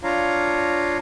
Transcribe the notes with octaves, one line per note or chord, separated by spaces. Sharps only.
D4 F4 C#5 F5 A#5